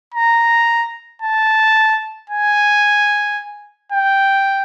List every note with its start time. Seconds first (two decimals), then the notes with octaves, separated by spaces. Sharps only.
0.14 A#5
1.22 A5
2.30 G#5
3.92 G5